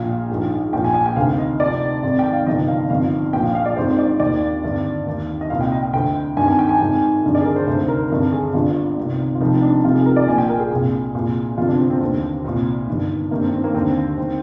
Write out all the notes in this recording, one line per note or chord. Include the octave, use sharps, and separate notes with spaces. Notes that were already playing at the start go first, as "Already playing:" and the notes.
Already playing: A#1 A#2 F5
A#1 G#2 D#3
A#1 A#2 G5
G#5
G#5
G5
D2 C3 D#3 F5
D#5
F1 F2 D#3 D5
G#1 G#2 D#3
G5
F5
G1 F2 C3 D#3 D#5
F5
G1 F2 D#3 F5
A#1 A#2 G5
F5
F5
D5
G#1 G#2 D#3 C5
C5
D5
C5
D#2 D#3 D5
G#1 G2 D3
D#2 D#3
D#5
C2 A#2 F5
G5
D#5
G5
D2 D3 G5
G#1 G2 D#3 G#5
G#5
G5
G#5
G#1 G#2 D#3
G#1 G2 D3
D5
G#4
A#4
C5
D2 C3 D#3 C5
A#4
G#1 G2 D3 A#4
G#4
G1 G2 D3 F4
C2 C3 D#3
F4
F1 F2 C3 D#3 D#4
D4
F1 F2 C3 D#3 F4
G#4
A#4
D5
A#1 A#2 G#5
G5
A#4
G#4
C2 A#2
C2 A#2
G1 F2 C3 F4
D4
C4
C4
D#2 D3 C4
C2 A#2
G1 G2 D#3
G#1 G2 D#3 A#3
C4
C4
A#3
D#2 D3 C4
D#3 C4